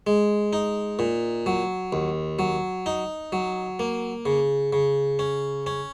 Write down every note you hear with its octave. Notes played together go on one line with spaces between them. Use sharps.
G#3
D#4
A#2
F#3
D#2
F#3
D#4
F#3
A#3
C#3
C#3
C#4
C#4